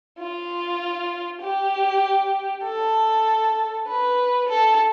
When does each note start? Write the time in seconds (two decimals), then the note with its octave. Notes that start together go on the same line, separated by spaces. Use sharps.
0.19 F4
1.41 G4
2.64 A4
3.87 B4
4.49 A4